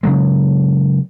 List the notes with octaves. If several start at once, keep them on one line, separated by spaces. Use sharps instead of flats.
C#3 F#3 G#3